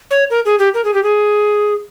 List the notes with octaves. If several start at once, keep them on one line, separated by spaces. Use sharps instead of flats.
C#5
A#4
G#4
G4
A#4
G#4
G4
G#4